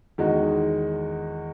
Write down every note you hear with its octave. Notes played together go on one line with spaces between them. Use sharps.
E2 D#3 G#3 D#4 F#4